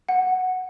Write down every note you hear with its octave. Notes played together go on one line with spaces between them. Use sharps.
F#5